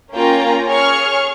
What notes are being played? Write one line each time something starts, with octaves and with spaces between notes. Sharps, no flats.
A#3 C#4 F4 G5 A#5
G#4 C#5 C#6 F6